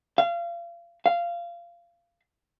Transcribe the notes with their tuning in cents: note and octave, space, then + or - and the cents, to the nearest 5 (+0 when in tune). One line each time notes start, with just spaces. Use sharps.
F5 -30
F5 -20